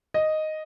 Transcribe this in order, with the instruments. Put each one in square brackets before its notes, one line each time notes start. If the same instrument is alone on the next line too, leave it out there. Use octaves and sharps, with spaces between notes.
[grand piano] D#5